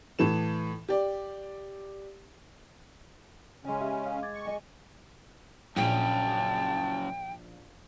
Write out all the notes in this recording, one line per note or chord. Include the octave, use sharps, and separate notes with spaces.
A2 E3 A4 E7
G4 D5
C#3 G#3 C#4 G#5
G4 E5
F5
D6 G#6 A6
C#6
G#4 D#5 G#5
A#1 F#2 C#3 C#4 G5 A5